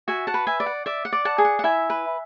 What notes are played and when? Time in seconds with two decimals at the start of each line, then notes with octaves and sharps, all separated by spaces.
0.08 F#4 E5 G#5
0.27 F#5 A5
0.34 B4
0.47 E5 G#5
0.60 D5
0.66 F#5
0.86 D5 E5
1.05 F#5
1.13 D5
1.25 F#5 A5
1.38 G#4
1.45 F#5
1.59 F#5
1.64 E4 E5 G#5
1.90 B4